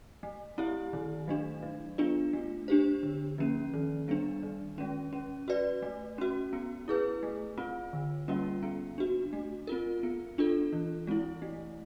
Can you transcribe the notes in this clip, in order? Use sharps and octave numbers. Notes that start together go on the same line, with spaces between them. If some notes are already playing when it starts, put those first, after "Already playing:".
A3
C4 E4 G4
D#3
F#3 A3 D4
F#3
B3 D4 F4
A3
D4 G4 C5
D3
F3 A#3 C#4
D#3
G3 B3 D4
D#3
G#3 C#4
C#4
F#4 B4 D5
A3
C#4 F#4
B3
E4 G#4 B4
A3
C4 F4
D3
G3 A#3 C#4 F4
B3
D4 F#4
A3
C4 F4 A#4
B3
D4 F4 A4
E3
G#3 C4 E4
A3